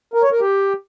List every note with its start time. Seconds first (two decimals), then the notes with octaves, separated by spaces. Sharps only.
0.14 A#4
0.23 C#5
0.31 A#4
0.40 G4